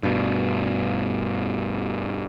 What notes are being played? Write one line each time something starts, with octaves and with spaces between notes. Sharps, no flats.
G2 B2